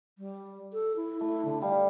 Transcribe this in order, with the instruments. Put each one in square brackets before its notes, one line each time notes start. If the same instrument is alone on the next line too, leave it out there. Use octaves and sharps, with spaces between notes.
[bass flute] G3
A4
E4
[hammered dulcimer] A3 [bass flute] E4
[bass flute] D3
[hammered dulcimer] G3 [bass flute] F5